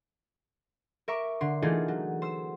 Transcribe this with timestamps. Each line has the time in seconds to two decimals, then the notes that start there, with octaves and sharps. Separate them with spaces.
1.08 A#4 E5 C#6 D6
1.41 D3 C6
1.62 E3 A3 A#3 D#4 F4 G#4
1.88 F#3
2.22 C5 E6